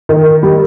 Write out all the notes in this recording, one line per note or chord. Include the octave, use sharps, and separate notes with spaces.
D#3
G3